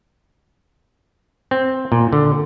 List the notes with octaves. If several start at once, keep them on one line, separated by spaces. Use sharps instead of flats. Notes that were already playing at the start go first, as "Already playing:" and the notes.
C4
A#2
D3